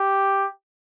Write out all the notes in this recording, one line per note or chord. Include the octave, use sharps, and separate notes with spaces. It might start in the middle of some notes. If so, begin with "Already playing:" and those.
Already playing: G4